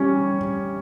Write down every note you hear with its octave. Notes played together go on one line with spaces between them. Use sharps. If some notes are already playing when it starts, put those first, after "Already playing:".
Already playing: G3 C#4 C#5